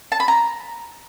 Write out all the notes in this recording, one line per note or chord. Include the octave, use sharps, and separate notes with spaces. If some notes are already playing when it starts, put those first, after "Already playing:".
A5
B5
A#5